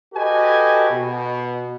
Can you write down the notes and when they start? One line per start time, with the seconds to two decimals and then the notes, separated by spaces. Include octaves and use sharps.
0.14 F#4 G4 A4 B4 D#5 G#5
0.90 B2